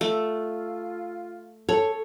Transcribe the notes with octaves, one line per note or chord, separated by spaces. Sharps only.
A3 F4
A4 C#5